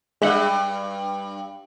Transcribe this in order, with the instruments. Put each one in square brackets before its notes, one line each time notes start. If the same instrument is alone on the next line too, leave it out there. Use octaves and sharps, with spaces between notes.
[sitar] G2 [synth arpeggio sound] G#3 E5 F#5